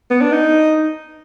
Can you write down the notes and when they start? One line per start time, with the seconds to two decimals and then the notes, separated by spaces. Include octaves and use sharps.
0.10 B3
0.22 D4
0.32 D#4